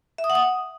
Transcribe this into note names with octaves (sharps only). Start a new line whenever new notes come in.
E5
D#6
F#5
D#6